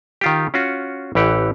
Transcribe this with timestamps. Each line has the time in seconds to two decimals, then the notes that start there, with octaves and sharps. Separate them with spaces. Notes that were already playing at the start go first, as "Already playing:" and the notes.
0.21 D#3 F4 G4
0.54 C#4 F4 F#4
1.15 A1 E3 G4 F#5